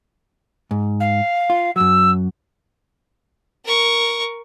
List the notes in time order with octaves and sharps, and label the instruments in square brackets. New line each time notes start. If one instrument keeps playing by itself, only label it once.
[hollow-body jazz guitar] G#2
[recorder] F5
[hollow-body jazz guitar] F4
[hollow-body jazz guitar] F#2 F#3 [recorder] E6
[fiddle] A#4 C#6